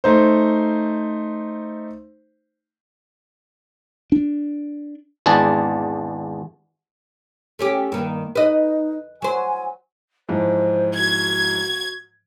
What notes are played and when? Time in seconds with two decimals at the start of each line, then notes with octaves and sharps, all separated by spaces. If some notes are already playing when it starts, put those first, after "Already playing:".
0.04 A3 D#4 C5
4.12 D4
5.26 G#1 E2 D4 G#4 A5
7.59 A3 C#4 G4
7.92 G2 D#3 A#3
8.35 D#4 B4 D#5
9.22 F#3 C5 G#5
10.29 G#2 E3 F3 C5
10.97 F#4 G#6